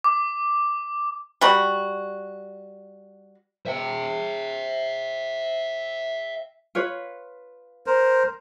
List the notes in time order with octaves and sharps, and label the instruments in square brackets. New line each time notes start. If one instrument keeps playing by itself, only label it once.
[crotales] D6
[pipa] G3 F#4
[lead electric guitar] E5 G5
[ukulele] F4 B4 C#5
[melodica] A#4 C5